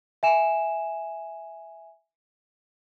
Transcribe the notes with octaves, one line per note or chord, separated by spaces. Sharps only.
E5 G#5 E7